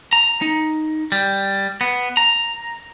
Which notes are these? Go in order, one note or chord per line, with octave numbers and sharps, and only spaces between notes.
A#5
D#4
G3
B3
A#5